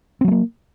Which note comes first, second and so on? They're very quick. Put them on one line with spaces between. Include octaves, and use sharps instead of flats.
C4 F#3 A3 A#3